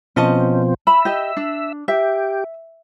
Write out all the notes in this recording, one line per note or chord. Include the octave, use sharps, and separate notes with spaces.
B2 F3 C4 C#4 D#5 A5
E5 B5
G4 D#5
D4
G4 E5